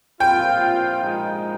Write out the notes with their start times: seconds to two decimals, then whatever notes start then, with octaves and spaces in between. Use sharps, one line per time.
0.20 A#2 F3 C4 F4 G5
1.00 A#2 F3 G#3 D#4